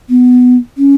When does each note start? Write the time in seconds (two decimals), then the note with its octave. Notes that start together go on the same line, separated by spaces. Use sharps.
0.10 B3
0.78 C#4